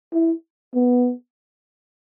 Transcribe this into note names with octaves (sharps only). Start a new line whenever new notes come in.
E4
B3